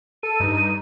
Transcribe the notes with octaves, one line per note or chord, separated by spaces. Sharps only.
A4 D#7
G2 D#4